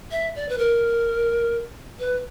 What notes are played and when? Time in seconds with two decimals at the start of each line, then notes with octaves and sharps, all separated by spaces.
0.11 E5
0.36 D5
0.49 B4
0.58 A#4
1.99 B4